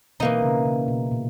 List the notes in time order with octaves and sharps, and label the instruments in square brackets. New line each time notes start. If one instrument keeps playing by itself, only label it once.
[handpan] B2 [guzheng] E3 A#3 D#4
[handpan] C#3
C#3
B2
A#2